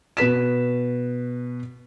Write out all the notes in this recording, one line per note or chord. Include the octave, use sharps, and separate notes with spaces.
B2 B4 B6 E7